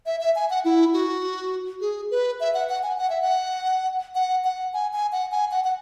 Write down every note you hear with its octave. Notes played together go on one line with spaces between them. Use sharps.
E5
E5
G#5
F#5
E4
F#4
G#4
B4
E5
F#5
F#5
G#5
F#5
E5
F#5
F#5
F#5
G#5
G#5
F#5
G#5
F#5
F#5